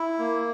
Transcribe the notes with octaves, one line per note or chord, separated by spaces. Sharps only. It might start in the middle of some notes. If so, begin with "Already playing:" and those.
Already playing: E4
A#3